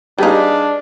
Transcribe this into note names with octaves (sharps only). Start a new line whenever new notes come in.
G3 D4 D#4 G#4 B4 F5